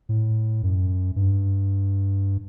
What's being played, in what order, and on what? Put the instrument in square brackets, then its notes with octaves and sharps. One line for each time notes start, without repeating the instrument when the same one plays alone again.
[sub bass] A2
F#2
G2